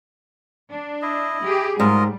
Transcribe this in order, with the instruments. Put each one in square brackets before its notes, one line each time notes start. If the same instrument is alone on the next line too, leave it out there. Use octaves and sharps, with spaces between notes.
[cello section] D4
[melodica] E4 D#5
[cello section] G4 G#4
[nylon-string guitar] G#2 [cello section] G3 [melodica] F4 A#4 D#5